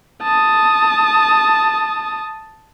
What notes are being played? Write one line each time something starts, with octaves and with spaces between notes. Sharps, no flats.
A5 D#6